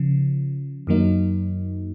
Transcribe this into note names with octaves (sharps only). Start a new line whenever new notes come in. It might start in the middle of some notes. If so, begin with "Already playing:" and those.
Already playing: C#3 F3
F#2 D#3 F#3 A#3 D#4